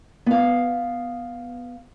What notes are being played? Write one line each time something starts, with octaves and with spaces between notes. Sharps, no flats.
B3 F5